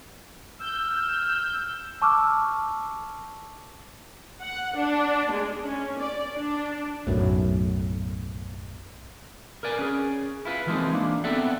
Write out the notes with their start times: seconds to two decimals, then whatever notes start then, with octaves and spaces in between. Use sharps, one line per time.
0.61 E6 F6 G6
2.02 A5 C#6 D6 E6 F6
4.41 F#5
4.77 D4
5.32 G#3
5.64 C#4
5.99 D5
6.35 D4
7.07 B1 F#2 A2
9.63 A#4 B4 D5 G#5
9.79 C#4 G#4
10.45 E4 F4 B4
10.67 E3 F3 G#3 A#3 C4 D#4
10.93 A#3 D4
11.24 B3 C4 A4 D5 E5 F#5